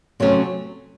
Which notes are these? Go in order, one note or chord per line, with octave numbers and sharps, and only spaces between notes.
C3 F#3 A3 C#4